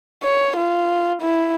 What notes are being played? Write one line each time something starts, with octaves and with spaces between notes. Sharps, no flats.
C#5
F4
E4